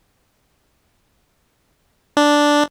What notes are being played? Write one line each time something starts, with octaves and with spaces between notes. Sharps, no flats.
D4